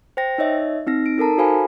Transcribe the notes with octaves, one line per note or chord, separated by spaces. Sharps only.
C5 G5 A#6
D#4 C#5 D#5 E5
C4 D#4 A#6
D7
D#4 A4 A#4 A5 A#5
F#4 A4 C5 F5 G#5 B5